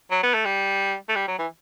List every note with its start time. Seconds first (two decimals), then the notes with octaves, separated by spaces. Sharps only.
0.11 F#3
0.23 B3
0.34 A3
0.45 G3
1.09 A3
1.15 G3
1.28 F#3
1.39 E3